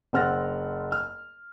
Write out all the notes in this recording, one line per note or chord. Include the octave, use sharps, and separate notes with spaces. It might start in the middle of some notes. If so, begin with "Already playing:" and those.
F#1 C4 F#5 F6 A6 A#6
F6